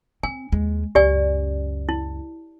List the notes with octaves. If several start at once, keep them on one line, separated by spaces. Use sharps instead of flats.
C4 G#5
D#2 G#3
C#2 F#2 G4 D5 G#5
E4